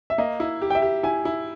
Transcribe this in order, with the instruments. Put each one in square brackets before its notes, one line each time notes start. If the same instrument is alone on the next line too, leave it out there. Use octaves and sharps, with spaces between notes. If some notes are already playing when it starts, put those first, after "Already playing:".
[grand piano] E5
[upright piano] A#3 [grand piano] D#5
[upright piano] E4
G4
[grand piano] G5
E5
[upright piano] G4
[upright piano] E4 [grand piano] G#5
[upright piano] E4